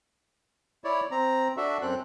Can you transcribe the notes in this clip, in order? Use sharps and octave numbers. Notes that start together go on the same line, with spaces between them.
E4 C#5 D5
C4 A#5
D4 F#4 A4 E5
F#2 C4 A4 F#6